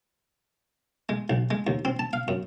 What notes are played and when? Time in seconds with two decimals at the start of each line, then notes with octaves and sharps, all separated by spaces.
1.09 G#3
1.30 B1
1.51 G#3
1.67 D#2
1.85 C4
1.99 A5
2.13 F5
2.28 F#2